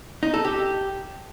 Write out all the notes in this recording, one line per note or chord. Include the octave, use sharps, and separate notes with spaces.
D#4
A4
G4